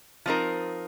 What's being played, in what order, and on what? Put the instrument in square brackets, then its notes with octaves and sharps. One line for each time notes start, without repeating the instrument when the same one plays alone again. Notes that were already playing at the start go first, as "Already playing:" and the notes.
[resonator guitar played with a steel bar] F3 C4 D#4 A#4